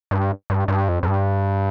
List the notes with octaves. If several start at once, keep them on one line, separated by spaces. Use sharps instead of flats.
G2
G2
G2
F2
F2
G2